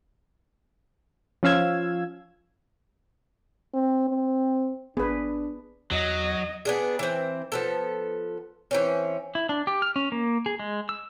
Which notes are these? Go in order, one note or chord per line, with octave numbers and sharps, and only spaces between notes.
F3 C#4 F5 E6 G#6
C4
C4
G#1 B3 D4 G#4 B4
E2 F#3 D#5
B3 D4 G#4
E3 C4
F3 B3 A4
E3 C4 C#4
E4
D4
G4
F6
C#4
A#3
G#4
G#3
E6